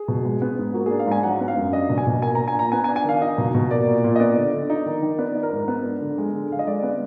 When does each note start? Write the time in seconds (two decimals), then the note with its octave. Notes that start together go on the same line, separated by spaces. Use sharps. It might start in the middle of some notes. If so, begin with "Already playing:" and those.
Already playing: G#4
0.08 B2
0.25 G#3
0.42 B3
0.58 G#2
0.74 A#3 F#4
0.86 D4 G#4
0.99 F5
1.07 G#2 G#5
1.23 F#3 F#5
1.40 B3
1.48 F5
1.57 F#2
1.73 D4 D#5
1.90 B2
1.98 G#5
2.06 B2
2.22 A#3 G#5
2.35 D4 A#5
2.48 G#5
2.55 A#2 A#5
2.72 B3 G#5
2.84 G#5
2.88 D4
2.96 G#5
3.05 D#3 F5
3.21 D#4 D#5
3.38 B2
3.55 B2
3.71 A#3 D5
3.87 A#2
4.04 A#2
4.16 D#5
4.20 B3 D5
4.37 D3
4.54 D3
4.70 D#4
4.86 D#3
5.02 D#3
5.18 B3 D5
5.35 D#4
5.43 A#4
5.52 G#2
5.68 B3
5.85 D4
6.01 D3
6.18 G#3
6.34 D3
6.51 D3 F5
6.59 D#5
6.67 G#3 D5
6.83 B3